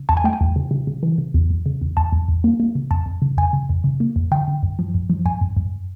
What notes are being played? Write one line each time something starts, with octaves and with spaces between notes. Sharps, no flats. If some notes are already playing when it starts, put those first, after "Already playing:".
Already playing: C#3
E2 A5
G#5
A3 G5
G#5
E2
C#3
C#3
C#3
E3
C#3
E2
E2
C#3
E2
E2 A5
E2
E2
A#3
A#3
C#3
F2 A5
F2
C#3
F2 G#5
C#3
F2
C#3
A#3
F2
D3 G5
D3
F#2
F3
F#2
F3
F#2 G#5
F#2
F#2